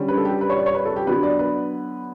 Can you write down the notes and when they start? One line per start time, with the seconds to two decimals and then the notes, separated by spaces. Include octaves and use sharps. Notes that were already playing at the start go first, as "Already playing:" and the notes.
Already playing: D3 G3 C#4
0.08 B4
0.18 A4
0.25 G4
0.41 B4
0.50 C#5
0.58 D5
0.66 C#5
0.75 B4
0.85 A4
0.96 G4
1.07 D3 F#3 B3 B4
1.23 D5
1.39 B4